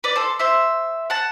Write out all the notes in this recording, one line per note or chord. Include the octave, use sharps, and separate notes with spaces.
B4 D5
A4 C5
C5 E5
F#5 A5